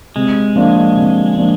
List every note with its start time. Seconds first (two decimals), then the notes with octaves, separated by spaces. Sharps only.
0.16 C3 G#3
0.56 F3 A#3 D4 F4
0.97 C3
1.37 F3 A#3 D4 F4